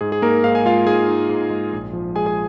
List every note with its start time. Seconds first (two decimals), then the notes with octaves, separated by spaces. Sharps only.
0.01 G#2 G#4
0.12 G#4
0.22 A#3 D#4 A#4
0.44 G#2 F5
0.55 G#5
0.65 G#3 F4 F5
0.86 G#2 G#4 G#5
1.08 D#4
1.29 G#2
1.50 G#3
1.73 A#1
1.93 F3
2.15 G#3 G#4 G#5
2.26 G#4 G#5